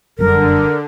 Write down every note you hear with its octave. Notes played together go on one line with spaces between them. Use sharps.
F1 F#2 D3 G3 A#4